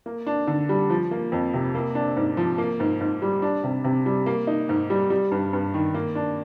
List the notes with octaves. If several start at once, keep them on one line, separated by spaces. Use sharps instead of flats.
A#3
D4
D3
G3
F3
A#3
F2
C3
A#3
D4
G#2
F3
A#3
G#2
G#2
G3
D4
C3
C3
G3
A#3
D#4
G#2
G3
G3
G2
G2
D#3
A#3
D4